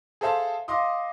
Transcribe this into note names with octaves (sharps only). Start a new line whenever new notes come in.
G#4 A4 C5 E5 F5 A5
D#5 F5 C6 D6 D#6